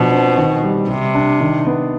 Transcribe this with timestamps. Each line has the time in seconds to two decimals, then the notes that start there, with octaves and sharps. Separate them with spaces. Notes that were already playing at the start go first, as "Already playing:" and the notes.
Already playing: B2 F3 D4
0.12 C4
0.38 D#3
0.63 G3
0.89 C3 G3
1.15 D4
1.41 D#3
1.66 B3